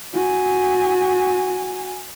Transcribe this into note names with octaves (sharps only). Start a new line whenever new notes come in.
F#4 G#5